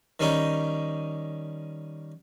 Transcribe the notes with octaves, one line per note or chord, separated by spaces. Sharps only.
D#3 G3 C#4 D#4